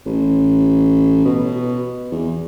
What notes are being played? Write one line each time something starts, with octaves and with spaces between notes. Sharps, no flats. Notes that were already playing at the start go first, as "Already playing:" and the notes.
A1
B2
E2